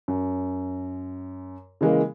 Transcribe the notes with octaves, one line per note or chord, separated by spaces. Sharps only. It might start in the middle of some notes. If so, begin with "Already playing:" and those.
F#2
C#3 E3 G#3 A#3